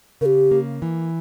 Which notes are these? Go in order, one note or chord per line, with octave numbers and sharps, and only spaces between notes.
C#3 G4 A#4
A#3
E3